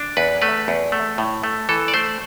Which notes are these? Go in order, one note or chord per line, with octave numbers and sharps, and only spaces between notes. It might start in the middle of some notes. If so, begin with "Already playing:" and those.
Already playing: D4
E2 B4
A3 B4
E2
A3
A2
A3
E3 A4
D5
A3 C5